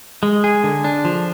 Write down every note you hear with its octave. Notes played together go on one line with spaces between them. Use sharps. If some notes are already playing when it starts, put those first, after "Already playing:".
G#3
G#4
D3
D4
F3